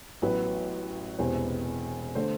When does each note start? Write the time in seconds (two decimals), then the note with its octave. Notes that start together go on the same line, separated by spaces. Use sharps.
0.22 A1 A2 F#3 B3 B4
1.19 E1 E2 C3 C5
2.15 D3 A3 C5